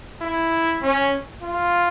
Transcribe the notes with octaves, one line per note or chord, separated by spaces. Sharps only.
E4
C#4
F4